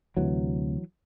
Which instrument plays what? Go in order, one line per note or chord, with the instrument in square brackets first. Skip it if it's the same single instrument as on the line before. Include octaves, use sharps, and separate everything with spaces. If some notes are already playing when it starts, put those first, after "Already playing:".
[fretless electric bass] D2 C3 E3 F#3